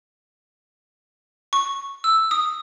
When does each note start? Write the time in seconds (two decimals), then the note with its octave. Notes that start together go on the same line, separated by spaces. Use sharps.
1.53 C#6
2.04 E6
2.31 D#6